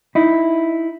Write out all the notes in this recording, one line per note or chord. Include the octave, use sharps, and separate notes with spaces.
D#4 E4